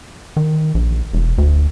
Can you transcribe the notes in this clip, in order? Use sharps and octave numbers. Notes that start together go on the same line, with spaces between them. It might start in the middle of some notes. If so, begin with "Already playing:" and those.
D#3
A#1
E1
D2